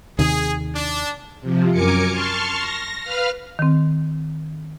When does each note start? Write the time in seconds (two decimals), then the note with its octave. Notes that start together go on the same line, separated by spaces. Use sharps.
0.19 D#2 C3 D#3 G#4
0.75 D4
1.41 C3 F3
1.71 F#2 A#4 G#5 D6 C#7
2.10 A5 C6 C#6 F6
2.57 A#6
3.01 B4 F5 F6
3.59 D#3 C4